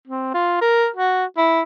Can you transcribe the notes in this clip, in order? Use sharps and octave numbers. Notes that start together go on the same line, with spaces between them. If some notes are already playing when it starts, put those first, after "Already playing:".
C4
F4
A#4
F#4
E4